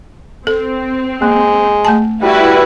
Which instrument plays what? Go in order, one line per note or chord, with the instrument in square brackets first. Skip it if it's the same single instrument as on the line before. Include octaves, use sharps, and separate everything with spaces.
[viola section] C4 [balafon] A4
[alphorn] G#3 [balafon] A#3
[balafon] A3 G#5 A5
[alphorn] G3 [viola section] E4 F#4 B4